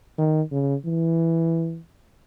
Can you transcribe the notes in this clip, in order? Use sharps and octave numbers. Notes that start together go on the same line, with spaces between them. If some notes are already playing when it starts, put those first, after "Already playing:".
D#3
C#3
E3